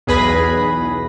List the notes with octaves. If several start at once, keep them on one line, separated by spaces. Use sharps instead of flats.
B1 E2 G#4 B4 B5 A#6